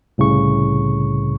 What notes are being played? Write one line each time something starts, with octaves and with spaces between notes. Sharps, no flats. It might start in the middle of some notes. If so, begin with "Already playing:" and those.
C2 A2 C#3 C#6